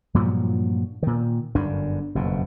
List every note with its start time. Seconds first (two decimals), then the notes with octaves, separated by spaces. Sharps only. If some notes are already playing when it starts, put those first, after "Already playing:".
0.14 G2 A#2 F3 F#3
1.03 A#2 D#3
1.55 G1 F#2 D3 D4
2.15 F#1 F2 B2